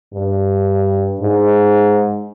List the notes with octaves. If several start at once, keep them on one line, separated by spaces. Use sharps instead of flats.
G2
G#2